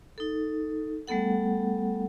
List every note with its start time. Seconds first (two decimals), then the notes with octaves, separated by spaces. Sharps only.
0.18 D#4 A4
1.07 G3 A3 B3 A4 F#5